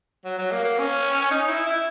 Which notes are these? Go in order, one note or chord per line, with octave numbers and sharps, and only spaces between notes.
F#3
F#3
A#3
A#3
C#4
D#4
E4
E4